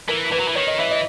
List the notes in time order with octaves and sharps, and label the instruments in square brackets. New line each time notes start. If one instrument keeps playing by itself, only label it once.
[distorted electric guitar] E3 [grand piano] A#4
[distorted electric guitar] E3 [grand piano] B4
[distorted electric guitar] F#3
E3
[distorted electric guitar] D#3 [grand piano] C#5
[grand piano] D#5
[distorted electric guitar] E3 [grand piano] E5
[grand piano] D#5